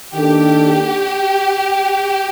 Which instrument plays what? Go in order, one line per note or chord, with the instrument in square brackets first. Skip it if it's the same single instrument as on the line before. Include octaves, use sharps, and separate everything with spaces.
[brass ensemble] D#3 A#3 D4 A4 [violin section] G4